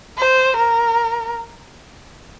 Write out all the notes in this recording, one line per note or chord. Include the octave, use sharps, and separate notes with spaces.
C5
A#4